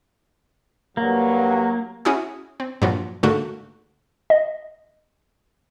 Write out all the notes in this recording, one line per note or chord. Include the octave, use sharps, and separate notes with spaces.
G2 F#3 A#3
C#4 E4 F#4 G#4
C4
G2 A#2 F3 F#3
G#2 D3 A3 A#3 F#4
D#5